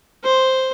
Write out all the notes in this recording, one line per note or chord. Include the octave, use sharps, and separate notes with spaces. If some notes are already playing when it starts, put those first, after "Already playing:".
C5